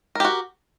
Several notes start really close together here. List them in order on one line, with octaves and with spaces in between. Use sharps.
A#4 G4 F#4